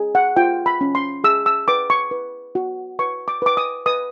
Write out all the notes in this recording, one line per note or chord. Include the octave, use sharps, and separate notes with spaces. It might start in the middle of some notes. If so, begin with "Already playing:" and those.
Already playing: G#4
F#5
F4 G5
B5
C#4
C6
G#4 E6
E6
B4 D6
C#6
B4
F#4
B4 C#6
D6
B4 D6
D#6
B4 D#6